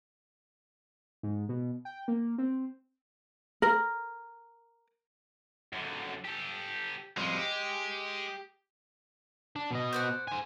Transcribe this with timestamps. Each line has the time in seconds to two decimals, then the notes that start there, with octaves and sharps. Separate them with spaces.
1.23 G#2
1.49 B2
1.85 G5
2.08 A#3
2.38 C4
3.62 A#4
5.73 F#2 D3
6.25 G4 A4
7.17 F2 G3 G#3 F4
7.39 G4
9.56 D4
9.71 B2 D#5
9.93 C5 D5 F#5
10.28 C5 G#5